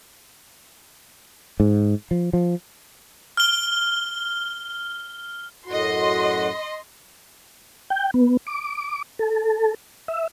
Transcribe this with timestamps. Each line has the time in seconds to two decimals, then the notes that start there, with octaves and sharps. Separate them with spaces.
1.60 G#2
2.11 F3
2.33 F3
3.37 F6 G7
5.66 F#2 A2 F#4 D#5 C6
7.90 G5
8.14 B3
8.47 D6
9.19 A4
10.08 E5